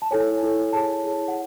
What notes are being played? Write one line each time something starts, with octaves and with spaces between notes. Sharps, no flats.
A5
E4 A4 C#5 G#5
E4 A4 C#5
E4 G#4 C#5 A5
E4 G#4 C#5
F#5